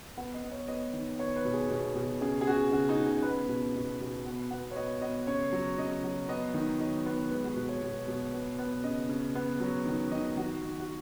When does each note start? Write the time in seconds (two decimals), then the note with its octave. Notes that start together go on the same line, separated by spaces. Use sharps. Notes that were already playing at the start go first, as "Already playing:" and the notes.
0.17 B3 F#5
0.34 D#5
0.43 B3
0.52 C#5
0.68 B3 D#5
0.93 D#3
1.19 B3 C#5
1.36 B4
1.45 B2
1.53 G#4
1.70 B2
1.95 B2
2.21 C#3 G#4
2.41 G#4
2.47 C#3 F#4
2.72 C#3 F#4
2.89 D#4
2.98 C#3
3.06 G#4
3.22 B3 B4
3.48 B2
3.74 B2
4.00 B2
4.26 B3
4.50 B3 F#5
4.71 C#5
4.76 B3 D#5
5.01 B3 D#5
5.27 C#3 C#5
5.52 F#3
5.78 C#3 D#5
6.03 F#3
6.29 B3 D#5
6.54 D#3
6.80 F#3 D#5
7.06 B3
7.31 G#3 B4
7.44 F#4
7.56 B2 B4
7.69 C#5
7.82 B2
8.08 B2
8.33 B3
8.59 B3
8.84 C#3 D#5
9.09 C#3
9.35 B3
9.60 F#3
9.85 D#3
10.11 D#3 D#5
10.37 D#3 F#4
10.63 D#3
10.80 F#4